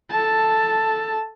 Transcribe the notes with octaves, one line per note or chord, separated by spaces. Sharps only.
A4 A5